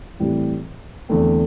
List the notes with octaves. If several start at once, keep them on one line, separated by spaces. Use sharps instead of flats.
A2 E3 G3 C4
E2 D3 A3 C4